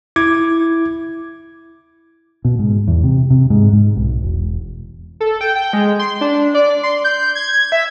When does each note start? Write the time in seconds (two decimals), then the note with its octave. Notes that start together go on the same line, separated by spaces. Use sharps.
0.16 E4 D6 G#6
2.45 B2
2.59 G#2
2.88 E2
3.04 C3
3.30 C3
3.50 G#2
3.72 G#2
3.96 B1
4.22 E1
5.20 A4
5.41 G5
5.55 G5
5.73 G#3
5.99 C6
6.21 D4
6.54 D5
6.83 C6
7.04 G6
7.35 G#6
7.72 E5